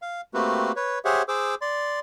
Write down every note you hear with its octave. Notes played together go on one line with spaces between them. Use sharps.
F5
A3 A#3 C4 F#4 G4 B4
B4 C#5
G4 G#4 C5 C#5 E5 F#5
G#4 C5 D6 E6
D5 C6